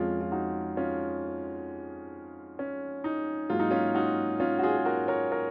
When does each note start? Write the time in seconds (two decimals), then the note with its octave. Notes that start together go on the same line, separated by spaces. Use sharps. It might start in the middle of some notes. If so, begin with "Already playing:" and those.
Already playing: F2 F3 G#3 C#4 F4
0.21 F4
0.32 D#4 F#4
0.77 C#4 F4
2.59 C#4
3.04 D#4
3.50 G#2 F#3 A#3 F4
3.59 D#4
3.71 C#4 F4
3.95 D#4 F#4
4.40 C#4 F4
4.59 F#4
4.63 F4 G#4
4.77 G#4
4.85 F#4 A#4
5.08 A#4 C#5
5.32 A#4 C#5